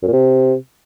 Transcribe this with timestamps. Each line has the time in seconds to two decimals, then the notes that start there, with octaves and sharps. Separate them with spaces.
0.02 F#2
0.08 A#2
0.13 C3